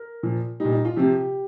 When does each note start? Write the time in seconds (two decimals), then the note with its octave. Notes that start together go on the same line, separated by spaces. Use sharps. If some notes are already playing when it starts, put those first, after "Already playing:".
Already playing: A#4
0.23 A#2 F3
0.60 A#2 G3 D#4
0.72 D#4
0.85 F4
0.96 C3 F3 G4